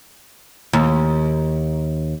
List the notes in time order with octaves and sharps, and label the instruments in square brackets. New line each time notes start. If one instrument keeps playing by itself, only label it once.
[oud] D#2